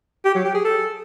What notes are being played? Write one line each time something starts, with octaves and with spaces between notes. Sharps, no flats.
G4
F#3
G4
G#4
A4